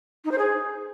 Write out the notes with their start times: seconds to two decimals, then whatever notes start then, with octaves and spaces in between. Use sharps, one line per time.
0.25 D#4
0.32 C5
0.38 G#4